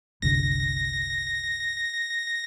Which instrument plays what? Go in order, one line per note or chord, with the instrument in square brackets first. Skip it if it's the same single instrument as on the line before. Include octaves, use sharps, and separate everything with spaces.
[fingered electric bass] F#1 C2 D3 [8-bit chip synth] A#6